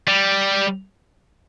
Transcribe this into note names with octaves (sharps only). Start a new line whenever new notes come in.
G3